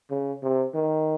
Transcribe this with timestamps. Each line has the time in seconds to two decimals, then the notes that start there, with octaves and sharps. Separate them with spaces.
0.10 C#3
0.42 C3
0.74 D#3